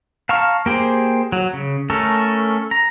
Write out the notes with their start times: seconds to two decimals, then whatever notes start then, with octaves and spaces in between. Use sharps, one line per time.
0.29 F5 A5 A#5 C#6 F6
0.66 A#3 G4 G#4 C5
1.32 F#3
1.53 C#3
1.90 A3 C#4 A4 A#4
2.71 A#5